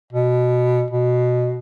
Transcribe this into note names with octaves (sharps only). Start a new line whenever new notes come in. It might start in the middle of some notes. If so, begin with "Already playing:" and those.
B2
B2